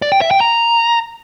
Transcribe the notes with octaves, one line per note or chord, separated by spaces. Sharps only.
D5
G5
E5
G5
A#5